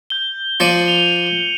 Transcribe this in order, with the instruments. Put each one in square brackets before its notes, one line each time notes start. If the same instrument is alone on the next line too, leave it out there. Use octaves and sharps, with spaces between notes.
[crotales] G6 G7
[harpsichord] F3 D5 [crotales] C#7 D#7 F#7
[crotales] F7 G7